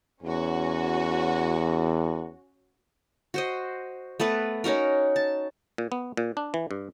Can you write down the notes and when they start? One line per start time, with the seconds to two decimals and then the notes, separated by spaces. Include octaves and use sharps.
0.23 E2 C#4 F#4
3.34 F#4 C5 D#5
4.20 A3 B3 A4 B4
4.64 C#4 D#4 F#4 A#4
5.16 A5
5.78 A#2
5.92 B3
6.17 A#2
6.37 D4
6.54 E3
6.71 G2